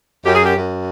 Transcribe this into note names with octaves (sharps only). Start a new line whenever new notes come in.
F#2 G4
G#4
G4
F#2